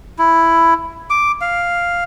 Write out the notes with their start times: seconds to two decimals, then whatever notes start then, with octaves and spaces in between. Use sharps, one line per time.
0.19 E4
1.10 D6
1.41 F5